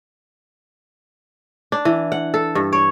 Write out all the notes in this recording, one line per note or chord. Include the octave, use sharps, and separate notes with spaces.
D4
E3
F#5
A4
G2
C#5